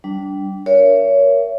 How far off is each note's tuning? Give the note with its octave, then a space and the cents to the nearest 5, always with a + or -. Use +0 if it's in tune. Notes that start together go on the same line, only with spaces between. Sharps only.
G3 -15 D4 -20
A#4 +10 C#5 +20 E5 +30